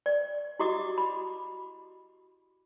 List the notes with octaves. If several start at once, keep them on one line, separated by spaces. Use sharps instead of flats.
D5
E4 F#4 G4 D#5 D6 D#6
B5